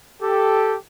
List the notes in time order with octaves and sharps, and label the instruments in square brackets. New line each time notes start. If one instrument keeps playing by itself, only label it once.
[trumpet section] G4 A4